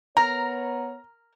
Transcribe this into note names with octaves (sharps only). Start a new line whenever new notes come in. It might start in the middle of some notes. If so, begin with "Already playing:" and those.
B3 A#4 C#5 A#5